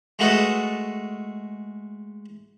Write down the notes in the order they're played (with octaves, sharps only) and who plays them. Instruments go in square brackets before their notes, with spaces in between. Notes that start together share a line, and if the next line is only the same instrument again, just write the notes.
[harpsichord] G#3 A3 F#4 A4 B4 D#5